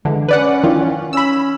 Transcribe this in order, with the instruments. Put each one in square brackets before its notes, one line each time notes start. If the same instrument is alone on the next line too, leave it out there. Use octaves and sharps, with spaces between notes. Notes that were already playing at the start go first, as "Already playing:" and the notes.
[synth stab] D3 E3 [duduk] G#3
[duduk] C#4 [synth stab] B4 D5 F#5
[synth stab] D#3 E3 F4
[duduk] C#4 [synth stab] B5 E6